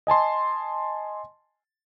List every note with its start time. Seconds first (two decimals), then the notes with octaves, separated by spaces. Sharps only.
0.07 D#5 G#5 A5 C6